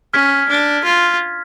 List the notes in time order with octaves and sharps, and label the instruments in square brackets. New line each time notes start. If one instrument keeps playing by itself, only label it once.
[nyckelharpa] C#4 [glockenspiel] F6 G#6 B6
[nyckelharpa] D4
F4